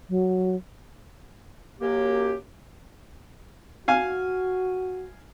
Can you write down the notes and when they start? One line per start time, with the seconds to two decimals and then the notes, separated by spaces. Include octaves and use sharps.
0.09 F#3
1.80 F#2 A#3 G4
3.88 F#4 F5 G#5 F6